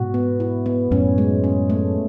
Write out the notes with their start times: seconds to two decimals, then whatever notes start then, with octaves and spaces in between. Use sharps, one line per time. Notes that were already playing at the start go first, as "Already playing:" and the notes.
Already playing: G#2 B2 F#4
0.14 B3
0.40 E4
0.66 B3
0.91 F#2 A2 C#4
1.18 G#3
1.44 C#4
1.70 A3